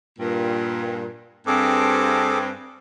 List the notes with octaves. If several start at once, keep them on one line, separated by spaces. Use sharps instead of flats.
G2 A#2
G2 C4 G#4 A4 D6